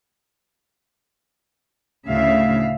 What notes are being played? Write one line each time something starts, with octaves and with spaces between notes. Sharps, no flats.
D2 A2 C#3 E5 F5